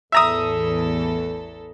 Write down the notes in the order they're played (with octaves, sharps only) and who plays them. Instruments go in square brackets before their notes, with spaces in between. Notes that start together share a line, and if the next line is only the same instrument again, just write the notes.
[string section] A1 E2 A4 [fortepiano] E5 A#5 D#6